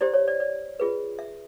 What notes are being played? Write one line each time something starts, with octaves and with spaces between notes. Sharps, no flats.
E4 G4 C5 D5
C#5
D5
D5
F4 G#4 B4
E5